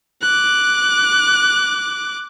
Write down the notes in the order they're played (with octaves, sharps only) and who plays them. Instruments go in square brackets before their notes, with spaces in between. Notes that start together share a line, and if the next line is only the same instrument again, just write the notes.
[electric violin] D6 F#6